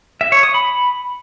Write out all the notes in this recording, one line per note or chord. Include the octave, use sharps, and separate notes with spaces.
E5
C#5
D#6
B5